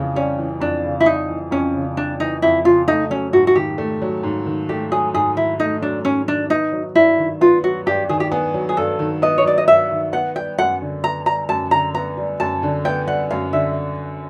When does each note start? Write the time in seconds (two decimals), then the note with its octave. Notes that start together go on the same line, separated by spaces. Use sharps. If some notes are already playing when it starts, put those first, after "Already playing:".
Already playing: F2 C#3 E3
0.15 G3 C#4
0.38 E3
0.61 F2 D4
0.84 C#3
1.00 E4
1.06 G3 D#4
1.29 E3
1.51 F2 C#4
1.75 C#3
1.97 G3 D4
2.20 E3 D#4
2.42 F2 E4
2.64 C#3 F4
2.88 A3 D#4
3.10 F#3 C#4
3.33 G#2 F#4
3.47 F#4
3.56 D#3 G4
3.78 A3
4.02 F#3
4.23 G#2
4.46 D#3
4.69 A3 G4
4.92 F#3 G#4
5.14 G#2 G#4
5.36 D#3 E4
5.60 A3 D#4
5.82 F#3 D4
6.05 G#2 C#4
6.28 D#3 D4
6.50 B3 D#4
6.72 F#3
6.95 G2 E4
7.19 D#3
7.41 B3 F4
7.63 F#3 F#4
7.86 G2 G4
8.09 D#3 G#4
8.20 G4
8.32 B3 G#4
8.54 F#3
8.69 G#4
8.77 G2 A4
8.99 D#3
9.22 B3 D#5
9.38 C#5
9.44 F#3 D5
9.58 D#5
9.67 G2 E5
9.91 D#3
10.13 B3 F#5
10.36 G3 G5
10.58 F#2 F#5
10.82 D3
11.03 B3 A#5
11.26 G3 A#5
11.49 F#2 A5
11.71 D3 A#5
11.95 B3 A#5
12.17 G3
12.40 F#2 A5
12.63 D3
12.85 B3 G5
13.07 G3 F#5
13.31 F#2 F5
13.53 D3 E5